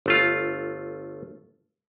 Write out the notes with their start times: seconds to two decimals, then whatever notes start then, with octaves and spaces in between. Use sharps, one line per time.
0.06 G1 A3 F4